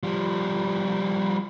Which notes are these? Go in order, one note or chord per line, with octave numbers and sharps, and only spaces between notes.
F3 G3